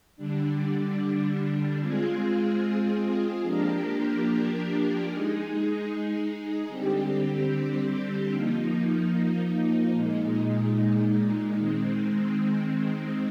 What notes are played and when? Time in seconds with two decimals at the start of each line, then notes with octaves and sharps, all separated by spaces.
0.16 D3 G3 D4
1.80 G#3 C4 F4 G#4
3.42 F3 A#3 D4 G4 A#4
5.06 G#3 D#4 G#4
6.68 D3 G3 C4 G4
8.31 F3 A#3 D#4
9.94 A#2 G#3 D#4
11.58 D#3 G#3 C4